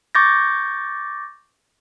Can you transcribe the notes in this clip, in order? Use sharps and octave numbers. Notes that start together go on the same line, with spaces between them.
C#6 D6 G6 A6 A#6